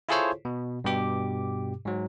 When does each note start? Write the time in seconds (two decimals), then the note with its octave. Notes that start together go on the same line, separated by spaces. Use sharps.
0.09 E4 F4 G#4 A4 C5 C#5
0.45 B2
0.84 G2 B2 G4 D6
1.85 G#2 F#3